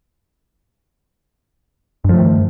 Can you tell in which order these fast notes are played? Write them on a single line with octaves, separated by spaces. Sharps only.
G2 F3 A3 D#3